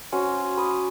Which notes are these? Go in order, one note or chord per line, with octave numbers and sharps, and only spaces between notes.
C#4 F#4 C5
B5 D#6